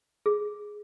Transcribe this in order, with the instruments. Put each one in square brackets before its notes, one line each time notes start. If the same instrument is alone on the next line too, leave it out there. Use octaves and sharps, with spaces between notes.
[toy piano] G#4